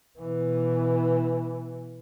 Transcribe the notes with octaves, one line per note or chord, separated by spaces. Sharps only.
B2 E3